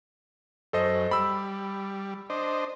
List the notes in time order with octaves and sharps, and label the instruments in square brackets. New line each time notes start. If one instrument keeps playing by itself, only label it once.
[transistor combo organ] F#2 [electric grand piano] A4 C5 D#5
[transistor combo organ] G3 [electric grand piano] B5 E6
[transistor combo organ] D4 C5 D#5